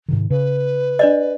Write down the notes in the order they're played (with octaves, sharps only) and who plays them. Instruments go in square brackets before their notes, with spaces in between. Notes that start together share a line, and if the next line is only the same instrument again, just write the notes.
[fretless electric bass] G#2 C3 D#3
[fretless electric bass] C#3 [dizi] B4
[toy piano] D4 D5 D#5